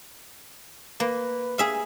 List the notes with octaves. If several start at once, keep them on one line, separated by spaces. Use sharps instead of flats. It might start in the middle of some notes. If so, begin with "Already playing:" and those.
A#3 B4
G#4 E5 F5